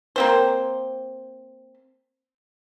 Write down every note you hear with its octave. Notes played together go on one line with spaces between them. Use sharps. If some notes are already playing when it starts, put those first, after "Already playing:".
A#3 C4 C5